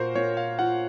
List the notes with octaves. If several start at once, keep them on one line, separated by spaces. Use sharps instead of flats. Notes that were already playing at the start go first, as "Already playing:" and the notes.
Already playing: A#2 F#4 A#4 C5
A#2 C#5
F5
F4 F#5